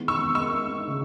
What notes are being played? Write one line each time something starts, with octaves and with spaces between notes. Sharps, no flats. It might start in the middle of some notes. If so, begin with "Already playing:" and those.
Already playing: D#3 G#3 B3 E4
C#6 E6
G#3 D#4 A#4 C#6 E6
C#3 G#3 D#4